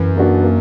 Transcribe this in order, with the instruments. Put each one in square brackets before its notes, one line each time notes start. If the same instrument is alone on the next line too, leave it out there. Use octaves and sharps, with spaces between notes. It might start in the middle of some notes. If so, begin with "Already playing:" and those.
Already playing: [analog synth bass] F#2 [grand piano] E3
[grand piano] A#3 D4 F#4
A#3